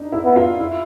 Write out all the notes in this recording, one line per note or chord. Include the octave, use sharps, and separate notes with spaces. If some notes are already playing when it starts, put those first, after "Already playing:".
Already playing: D4 D#4
E4
B3
F4
E4